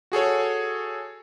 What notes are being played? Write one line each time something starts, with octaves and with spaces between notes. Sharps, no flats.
F#4 G#4 A4 C#5